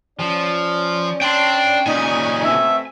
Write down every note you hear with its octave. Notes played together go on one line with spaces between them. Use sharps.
F3 C#4 D5
D4 G5 C6
A#2 C#3 D#4 G#5
B2 A3 C4 E5